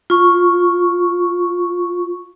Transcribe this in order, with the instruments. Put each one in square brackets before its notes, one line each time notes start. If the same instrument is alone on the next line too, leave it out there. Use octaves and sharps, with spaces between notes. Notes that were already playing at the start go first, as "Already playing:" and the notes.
[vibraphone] F4 C#6